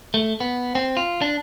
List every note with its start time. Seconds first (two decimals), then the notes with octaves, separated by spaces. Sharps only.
0.14 A3
0.40 B3
0.75 C4
0.97 F4
1.22 D4